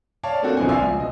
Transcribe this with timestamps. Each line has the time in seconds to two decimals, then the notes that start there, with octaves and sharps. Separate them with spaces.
0.23 C#5 D5 F5 A5
0.42 A3 A#3 C4 D4 F#4 A4
0.57 A#1 B2 D3 E3 C4 G#5
0.69 D5 E5 F5 G#5 C6 E6
0.82 C#2 F3
0.97 B2 D#5